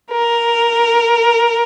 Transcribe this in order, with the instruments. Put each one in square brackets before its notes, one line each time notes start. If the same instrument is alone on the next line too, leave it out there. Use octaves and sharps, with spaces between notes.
[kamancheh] A#4